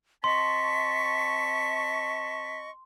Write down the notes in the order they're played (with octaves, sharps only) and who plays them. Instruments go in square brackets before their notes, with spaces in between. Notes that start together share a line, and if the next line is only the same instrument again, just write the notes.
[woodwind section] C4 A5 C#6 [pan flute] D#5 [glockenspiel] C6 [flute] B6